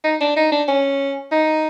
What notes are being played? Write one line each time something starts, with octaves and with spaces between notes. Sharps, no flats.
D#4
D4
D#4
D4
C#4
D#4